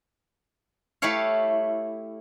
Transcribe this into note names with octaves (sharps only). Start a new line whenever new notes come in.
A3 E4 G4 A4 C#5 F5